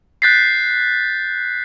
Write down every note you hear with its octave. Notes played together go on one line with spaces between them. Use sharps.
F#6 G6 A6 B6 C7